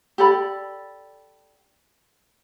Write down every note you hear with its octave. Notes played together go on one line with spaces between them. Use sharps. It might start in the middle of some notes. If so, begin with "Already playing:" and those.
G4 A4 D5 B5